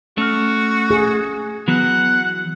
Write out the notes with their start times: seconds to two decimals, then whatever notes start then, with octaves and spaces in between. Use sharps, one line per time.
0.18 A3 C#4 F#4 F6
0.91 G#4
1.68 E3 F#3 B3 F#5